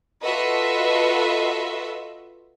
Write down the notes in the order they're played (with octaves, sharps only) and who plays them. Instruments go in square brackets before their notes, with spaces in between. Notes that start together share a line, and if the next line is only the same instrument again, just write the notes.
[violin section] F4 F#4 A4 B4 D#5 E5